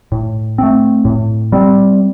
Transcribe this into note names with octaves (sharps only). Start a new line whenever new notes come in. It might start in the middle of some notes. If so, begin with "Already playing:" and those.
A2
A3 C4
A2
G3 C4